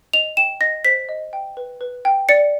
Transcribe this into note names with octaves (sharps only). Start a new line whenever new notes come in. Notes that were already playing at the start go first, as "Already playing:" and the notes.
D#5 F7
G5 E7
D#5 A#6
C5 B6
D#5
G5
B4
B4
G5
D5 C#7